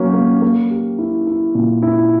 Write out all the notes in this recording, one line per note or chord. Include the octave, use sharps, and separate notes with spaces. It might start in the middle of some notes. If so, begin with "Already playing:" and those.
Already playing: F#3 A#3 C#4
A#3
A#3
G4
E4
E4
A#2
E4